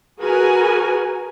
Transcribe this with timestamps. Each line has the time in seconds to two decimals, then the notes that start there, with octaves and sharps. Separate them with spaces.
0.20 F#4 G#4 A#4 B4 G#5